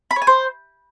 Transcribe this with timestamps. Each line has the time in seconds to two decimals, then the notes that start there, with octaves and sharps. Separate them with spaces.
0.11 B5
0.16 C#5
0.22 G#5
0.27 C5